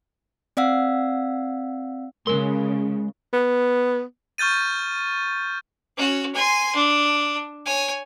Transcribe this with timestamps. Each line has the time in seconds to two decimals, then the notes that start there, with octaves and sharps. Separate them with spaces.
0.57 C4 D5 F5 F#5 E6
2.27 C#3 G#3 A#4 C6
3.33 B3
4.38 C#6 F6 G6 A6 D#7
5.97 C#4 F#4
6.35 G#5 C6
6.75 D4
7.66 C#5 G#5